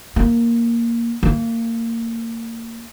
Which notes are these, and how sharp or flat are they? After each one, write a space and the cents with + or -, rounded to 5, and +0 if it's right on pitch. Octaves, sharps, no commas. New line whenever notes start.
A#3 +0
A#3 -25